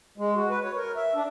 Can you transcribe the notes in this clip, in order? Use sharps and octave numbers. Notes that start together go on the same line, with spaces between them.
G#3
F#4
B4
C#5
A#4
E5
D4